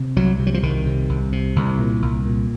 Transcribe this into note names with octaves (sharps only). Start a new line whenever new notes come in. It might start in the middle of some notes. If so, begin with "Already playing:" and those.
Already playing: C3
C2 F#3
C3
F#3
F3
C2 D#3
C3
C2
C3
C2
A#2
C2
A#2